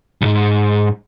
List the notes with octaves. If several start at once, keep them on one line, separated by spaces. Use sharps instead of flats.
C2 G#2